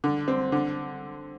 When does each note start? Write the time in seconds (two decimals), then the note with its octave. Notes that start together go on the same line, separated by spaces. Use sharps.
0.04 D3
0.28 C4
0.52 D3